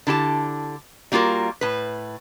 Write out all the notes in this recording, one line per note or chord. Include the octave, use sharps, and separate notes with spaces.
D3 E4 G4 A5
G3 A#3 F4 F#4 A#4
A2 B4